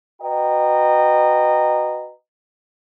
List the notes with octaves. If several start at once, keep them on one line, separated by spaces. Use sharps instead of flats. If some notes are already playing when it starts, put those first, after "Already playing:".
F#4 B4 D#5 G5 A#5